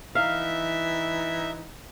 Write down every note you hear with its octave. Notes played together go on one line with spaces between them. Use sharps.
E3 D#4 E5 F5